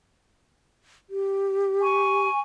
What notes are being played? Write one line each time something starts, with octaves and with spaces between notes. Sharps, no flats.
G4
G#5 C#6